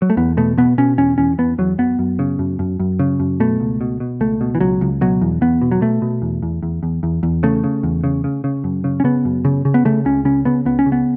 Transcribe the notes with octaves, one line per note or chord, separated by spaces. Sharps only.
F#3
A3
E2 B3
B2 A3
B2 B3
B2 C#4
E2 C#4
E2 C#4
E2 B3
E2 F#3
F#2 B3
F#2
C#3
F#2
F#2
F#2
C#3
F#2
B2 A3
C#2
B2
B2
C#2 A3
B2
E3
C#2 F#3
C#2
B2 F#3
E2
E2 B3
B2
F#3
B2 A3
B2
E2
E2
E2
E2
E2
E2
C#3 A3
C#3
E2
C#3
C#3
C#3
F#2
C#3
C#4
C#3 B3
F#2
C#3
C#3
B3
C#3 A3
C#2 C#4
C#3 C#4
C#3 B3
C#2 B3
C#4
C#3
B3